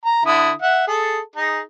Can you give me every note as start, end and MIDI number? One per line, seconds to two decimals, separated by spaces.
0.05 0.25 82
0.26 0.51 50
0.26 0.51 64
0.26 0.51 87
0.62 0.84 76
0.62 0.84 78
0.87 1.19 68
0.87 1.19 69
1.36 1.61 63
1.36 1.61 68